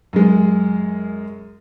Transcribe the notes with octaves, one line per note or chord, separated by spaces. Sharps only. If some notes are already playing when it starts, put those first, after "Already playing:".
F#2 G#3